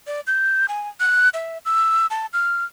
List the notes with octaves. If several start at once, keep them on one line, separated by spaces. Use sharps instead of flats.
D5
G6
G#5
F#6
E5
E6
A5
F6